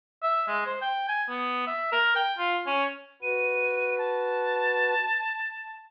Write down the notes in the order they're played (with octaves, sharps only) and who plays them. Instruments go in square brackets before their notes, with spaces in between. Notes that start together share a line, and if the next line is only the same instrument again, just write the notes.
[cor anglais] E5
G#3
C5
G5
G#5
B3
E5
A#4
G5
F4
C#4
[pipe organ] F#4 B4 [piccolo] D#7
[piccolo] A5